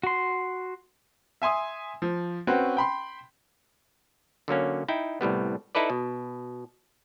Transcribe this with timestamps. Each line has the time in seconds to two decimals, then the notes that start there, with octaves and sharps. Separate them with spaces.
0.03 F#4 C6
1.42 E5 G#5 C6 D#6
2.02 F3
2.47 C4 C#4 F#4 B4
2.77 G5 B5 C6
4.48 D3 F#3 A#3 C#4
4.88 D#4 E4 G5
5.21 C2 A2 G3 B3
5.75 D#4 E4 A4 B4 D5
5.90 B2